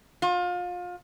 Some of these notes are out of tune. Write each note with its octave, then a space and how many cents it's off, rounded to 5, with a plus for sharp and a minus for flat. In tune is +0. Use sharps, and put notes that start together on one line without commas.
F4 +30